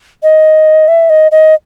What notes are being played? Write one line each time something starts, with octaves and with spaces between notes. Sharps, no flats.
D#5
E5
D#5
D#5